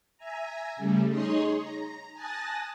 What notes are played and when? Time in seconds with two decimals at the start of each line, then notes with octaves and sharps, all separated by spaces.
0.17 E5 G#5 A#5
0.76 C#3 G3 A3
1.08 D#4 G#4 C#5 D#5 C6
1.56 A#5
2.13 G#5 A5 D#6 F#6 A6 A#6